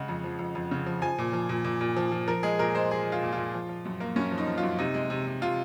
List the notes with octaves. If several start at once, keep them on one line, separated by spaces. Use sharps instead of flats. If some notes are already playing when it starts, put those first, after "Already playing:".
Already playing: C#3 G#3 F#5
F2
F3
F2
F2
C#3
F3
F3 G#5
A#2
F3
A#2
A#2
A#2
F3
F3
F3 A#4
G#3 G#4
A#2 A#4
G#3 C5
G#3 G#4
G#3
F4
A#2
F4
A#2
F3
F3
F#2
A#3
F#2 C#4
F3
D#4
F3
F4
F#2
C3 D#4
G#3
C3
C3
C3 F4